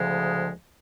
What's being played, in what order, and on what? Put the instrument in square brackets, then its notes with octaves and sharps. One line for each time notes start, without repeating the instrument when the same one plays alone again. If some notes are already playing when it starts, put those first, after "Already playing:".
Already playing: [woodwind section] D2 C#3 F3 G#3